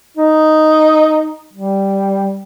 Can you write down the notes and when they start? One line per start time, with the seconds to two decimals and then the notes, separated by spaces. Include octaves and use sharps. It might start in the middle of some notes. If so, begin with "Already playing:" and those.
0.17 D#4
1.53 G3